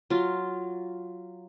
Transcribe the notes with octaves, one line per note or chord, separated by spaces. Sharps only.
F#3 F4